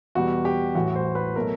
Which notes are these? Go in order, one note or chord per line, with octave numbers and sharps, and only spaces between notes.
E2 B2 G3 F#4
G4
A1 A2 E3 F#4
C5
B4
B2 F#3 A3 A#4